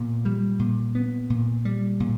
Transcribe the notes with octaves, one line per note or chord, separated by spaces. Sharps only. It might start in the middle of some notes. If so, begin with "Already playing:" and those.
Already playing: A#2 B3
G3
A#2
B3
A#2
G3
A#2